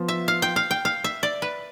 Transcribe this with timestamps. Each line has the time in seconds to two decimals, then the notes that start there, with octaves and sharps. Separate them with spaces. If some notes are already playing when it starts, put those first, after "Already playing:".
Already playing: F3 B3 F4
0.08 E5
0.28 F5
0.42 G5
0.56 F5
0.71 G5
0.85 F5
1.04 E5
1.23 D5
1.42 B4